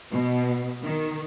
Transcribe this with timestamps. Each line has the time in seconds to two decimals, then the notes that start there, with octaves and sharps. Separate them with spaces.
0.11 B2
0.84 D#3